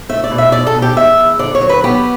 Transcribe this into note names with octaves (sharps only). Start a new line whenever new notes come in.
A3 E5
D5
B2
E5
B2 D5
A4
B2
G4
E2 E5
E2
D3 D5
C#5
F#3
B4
B3 G4